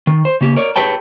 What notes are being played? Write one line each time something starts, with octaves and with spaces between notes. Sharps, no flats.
D#3
C5
C#3 A#3 G4
A#4 C#5 D5
G4 G#4 B4 C#5 G5 A5